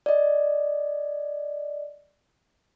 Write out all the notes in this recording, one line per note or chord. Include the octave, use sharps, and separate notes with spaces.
D5 D#5